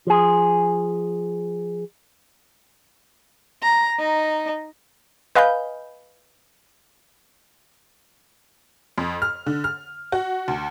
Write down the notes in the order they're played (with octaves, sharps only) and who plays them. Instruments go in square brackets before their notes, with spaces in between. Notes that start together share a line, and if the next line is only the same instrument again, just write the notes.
[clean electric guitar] F3 G#4
[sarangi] A#5
D#4
[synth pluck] B4 D#5 F5 G#5 B5 G6
[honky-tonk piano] F2
F6
D3
F6
F#4
D2